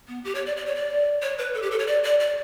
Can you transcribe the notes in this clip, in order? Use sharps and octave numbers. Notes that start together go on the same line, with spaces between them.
B3
G4
C#5
D5
D5
C#5
D5
C#5
B4
A4
G4
A4
C#5
D5
D5
D5